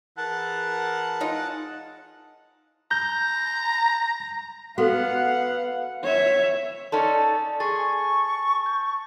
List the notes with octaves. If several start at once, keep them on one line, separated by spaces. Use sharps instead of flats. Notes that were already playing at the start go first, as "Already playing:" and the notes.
E3 G#4 A#4 F#5 A5 F#6
G#3 D#4 F4
A#5 G6
B3 F#4 A4 B4 F5 F#5
C#5 E5
C#4 D#4 A4 D5 A5 C6
G#4 C6 C#6 A6
G6